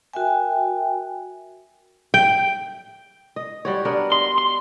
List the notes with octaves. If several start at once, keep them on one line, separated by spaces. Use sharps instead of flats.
F#4 A#4 E5 G5 G#5
G5
D#5
G3 F#4 C#5
B3 D4 A#4
D#5 C6
C6